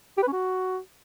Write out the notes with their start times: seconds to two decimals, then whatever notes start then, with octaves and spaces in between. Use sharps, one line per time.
0.18 G4
0.23 B4
0.28 C#4
0.33 F#4